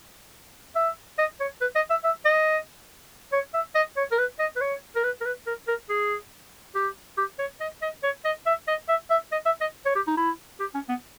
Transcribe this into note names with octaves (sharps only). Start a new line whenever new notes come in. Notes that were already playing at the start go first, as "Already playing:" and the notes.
E5
D#5
C#5
B4
D#5
E5
E5
D#5
C#5
E5
D#5
C#5
A#4
B4
D#5
B4
C#5
A#4
B4
A#4
B4
A#4
A#4
G#4
G4
G4
C#5
D#5
D#5
C#5
D#5
E5
D#5
E5
E5
D#5
E5
D#5
C#5
G4
D#4
E4
G4
C#4
B3